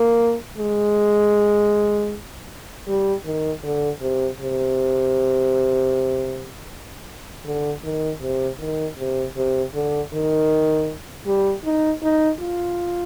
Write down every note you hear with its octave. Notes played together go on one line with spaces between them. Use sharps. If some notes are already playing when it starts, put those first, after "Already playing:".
Already playing: A#3
G#3
G3
D#3
D3
C3
C3
D3
D#3
C3
D#3
C3
C3
D3
D#3
G3
D#4
D#4
F4